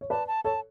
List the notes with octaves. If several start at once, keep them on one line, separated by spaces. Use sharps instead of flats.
C#5
B4 D5 A5
A5
A4 C#5 A5